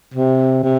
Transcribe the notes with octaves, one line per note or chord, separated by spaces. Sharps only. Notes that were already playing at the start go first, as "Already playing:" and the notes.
C3
C3